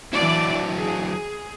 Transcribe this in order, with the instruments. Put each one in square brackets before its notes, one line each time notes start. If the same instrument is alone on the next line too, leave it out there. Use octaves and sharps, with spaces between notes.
[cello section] E3 D5 [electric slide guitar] F#3 D4 E4
[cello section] G#4